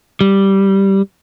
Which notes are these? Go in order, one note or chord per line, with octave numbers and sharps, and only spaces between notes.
G3